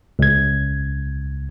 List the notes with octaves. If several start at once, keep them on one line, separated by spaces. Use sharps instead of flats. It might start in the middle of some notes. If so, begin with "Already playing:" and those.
C#2 G#6